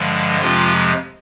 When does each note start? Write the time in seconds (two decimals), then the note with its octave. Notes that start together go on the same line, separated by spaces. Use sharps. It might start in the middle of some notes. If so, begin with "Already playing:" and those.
Already playing: G2 D3 F3 G#3
0.41 F2 C3 F3 G#3 F4